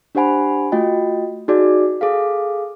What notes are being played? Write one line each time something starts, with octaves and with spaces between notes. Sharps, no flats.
D4 G4 C5 F#5 G#5 B5
A3 F4 F#4 D#5 G5
D#4 F#4 G#4 D5
G#4 A4 F5